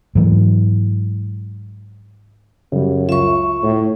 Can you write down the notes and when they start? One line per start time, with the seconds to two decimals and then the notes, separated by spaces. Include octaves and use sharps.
0.15 G#2 E3 F#3
2.72 F#2 C#3 G3
3.09 C#2 F4 E5 C#6
3.63 A2